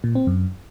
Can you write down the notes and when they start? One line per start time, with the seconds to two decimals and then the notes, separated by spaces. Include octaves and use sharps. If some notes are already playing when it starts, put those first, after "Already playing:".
0.04 A#2
0.15 C4
0.27 F#2